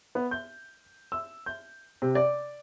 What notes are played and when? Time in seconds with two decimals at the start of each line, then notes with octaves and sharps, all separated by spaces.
0.15 B3
0.31 G6
1.12 E6
1.46 G6
2.02 C3
2.15 D5